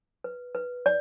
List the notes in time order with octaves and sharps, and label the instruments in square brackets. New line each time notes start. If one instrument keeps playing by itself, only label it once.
[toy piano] B4
B4
D5